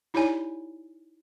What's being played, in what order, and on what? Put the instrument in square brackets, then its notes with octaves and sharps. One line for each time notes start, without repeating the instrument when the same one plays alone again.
[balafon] D#4 E4 G4 C#5 D5 G#5